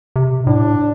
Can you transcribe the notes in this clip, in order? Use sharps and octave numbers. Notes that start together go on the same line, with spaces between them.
C3
A2 D4